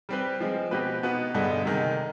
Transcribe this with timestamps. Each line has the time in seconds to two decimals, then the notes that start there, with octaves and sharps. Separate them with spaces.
0.09 G3 C4 G4 B4
0.40 F3 G#3 C4
0.71 B2 G#3 C4 G4 B4
1.03 B2 B3 D#4 B4
1.35 G2 D3 G#3 B3
1.65 C3 D#3 G#3